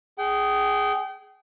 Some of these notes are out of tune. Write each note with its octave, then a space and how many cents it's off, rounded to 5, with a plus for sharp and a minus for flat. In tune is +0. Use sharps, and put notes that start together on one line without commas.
G#4 +0 G5 -35